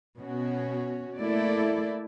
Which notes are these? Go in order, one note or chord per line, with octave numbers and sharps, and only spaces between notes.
B2 C#4 F#4
A3 A#3 E4 A4 D5